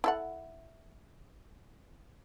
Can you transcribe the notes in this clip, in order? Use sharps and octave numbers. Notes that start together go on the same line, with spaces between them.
E4 A4 F#5